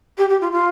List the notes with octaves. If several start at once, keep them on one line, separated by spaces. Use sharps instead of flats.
G4
G4
F4
F4